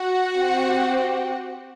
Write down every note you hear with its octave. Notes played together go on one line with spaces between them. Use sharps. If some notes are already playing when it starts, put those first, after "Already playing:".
Already playing: F#4 F#5
C4 G4